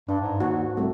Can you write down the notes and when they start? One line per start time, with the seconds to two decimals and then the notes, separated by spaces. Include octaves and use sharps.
0.09 G2 D4
0.21 G#2
0.40 D#2 F#4
0.77 C2 A3